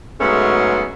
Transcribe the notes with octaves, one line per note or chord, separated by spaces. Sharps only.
G#2 F#3 G#3 A3 B3 C#4